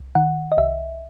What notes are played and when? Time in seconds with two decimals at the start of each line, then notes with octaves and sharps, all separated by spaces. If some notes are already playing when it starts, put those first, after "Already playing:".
Already playing: C2
0.15 D#3 F#5
0.52 D#5
0.58 C2 E5